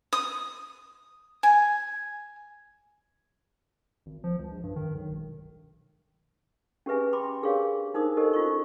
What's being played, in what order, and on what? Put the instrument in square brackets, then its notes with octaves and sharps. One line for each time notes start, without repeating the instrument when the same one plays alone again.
[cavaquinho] D#6
G#5
[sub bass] G#1
F3
C#2
A#1
G2
D#3
B1
E1
[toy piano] C#4 G4 G#4 B4 E5 G#5
G5 B5 C6 D6
D4 G4 G#4 A#4 C#5 F5
D4 D#4 A#4 C5 D#6
G4 A4 A#4 C5 D#5
C#4 F4 F#4 C5 D#5 C#6